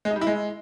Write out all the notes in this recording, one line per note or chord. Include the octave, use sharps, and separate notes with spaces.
G#3
D#4
G3
E4
G#3